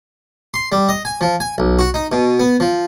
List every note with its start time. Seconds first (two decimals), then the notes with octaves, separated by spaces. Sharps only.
0.54 C6
0.72 G3
0.89 D#5
1.05 G#5
1.21 F3
1.40 G#5
1.58 B1
1.79 F#4
1.94 D#4
2.12 B2
2.40 B3
2.60 F3